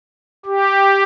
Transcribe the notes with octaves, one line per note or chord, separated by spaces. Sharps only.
G4